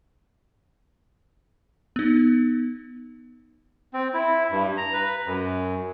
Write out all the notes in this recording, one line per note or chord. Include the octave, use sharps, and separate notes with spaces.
B3 D#4
C4
E4
G2
A#5
B4
F#2